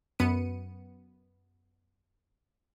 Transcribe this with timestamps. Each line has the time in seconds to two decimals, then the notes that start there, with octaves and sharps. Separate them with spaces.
0.19 F#2 B3 C#7 D#7